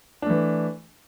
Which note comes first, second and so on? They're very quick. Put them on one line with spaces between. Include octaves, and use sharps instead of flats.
D4 A3 E3